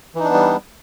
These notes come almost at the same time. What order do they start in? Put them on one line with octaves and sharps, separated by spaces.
E3 D#4 D4 B3 G3